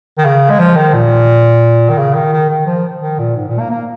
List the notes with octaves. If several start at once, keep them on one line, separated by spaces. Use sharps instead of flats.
D#3
C#3
G#3
F3
D#3
A#2
D#3
C#3
D#3
D#3
D#3
F3
D#3
A#2
G#2
A#2
A#3
A#3